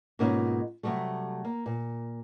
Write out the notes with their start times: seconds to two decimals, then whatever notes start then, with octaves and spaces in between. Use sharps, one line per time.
0.19 G#2 B2 A#3 C#4 D#4 F4
0.83 C3 E3 F#3 G3 A3
1.45 A#3
1.66 A#2